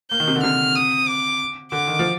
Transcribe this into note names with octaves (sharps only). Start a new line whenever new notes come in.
A#3 G6
D#3
C3
D3
C3 F6
D#6
D6
D3 D6
D#3
F3